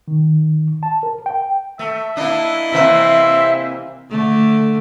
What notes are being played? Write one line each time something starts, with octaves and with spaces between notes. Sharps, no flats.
D#3
A5
A#4
G5
A3 E5
A#3 D4 E4 D#5
C3 E3 A#3 C4 E5
D3 A3